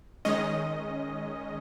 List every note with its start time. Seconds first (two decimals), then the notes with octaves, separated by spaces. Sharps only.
0.25 D#3 G#3 C#4 D#5